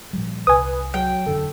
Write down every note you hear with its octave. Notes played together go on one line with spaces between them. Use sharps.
A#2 F3 G3
C2 B4 G#5 D#6
F#3 G5
E1 F#2 D3 A4